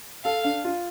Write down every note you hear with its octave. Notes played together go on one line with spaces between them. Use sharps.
A4 F5
D4
F4